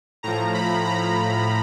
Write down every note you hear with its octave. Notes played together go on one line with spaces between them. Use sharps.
A2 F3 A#5
B5
A#5